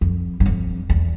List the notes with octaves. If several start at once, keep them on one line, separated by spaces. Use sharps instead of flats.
F2
G2
F2
E2